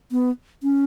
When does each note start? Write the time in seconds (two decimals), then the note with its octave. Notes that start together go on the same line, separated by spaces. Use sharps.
0.12 B3
0.63 C#4